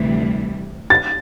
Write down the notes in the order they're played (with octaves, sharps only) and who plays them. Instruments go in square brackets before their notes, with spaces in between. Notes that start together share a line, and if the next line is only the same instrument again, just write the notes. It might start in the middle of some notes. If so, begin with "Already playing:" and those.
Already playing: [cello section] D2 C3 E3 G3
[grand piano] A6